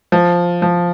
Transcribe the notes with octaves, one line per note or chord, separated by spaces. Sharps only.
F3
F3